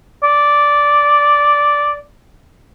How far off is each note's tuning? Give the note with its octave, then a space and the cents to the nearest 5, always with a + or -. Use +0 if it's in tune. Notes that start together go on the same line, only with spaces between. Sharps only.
D5 -5